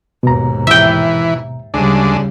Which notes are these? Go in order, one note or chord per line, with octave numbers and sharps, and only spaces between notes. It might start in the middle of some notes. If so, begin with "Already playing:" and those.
D#2 G#2 B2 A#5
E3 E5 G5
D2 C#3 G3 G#3 D4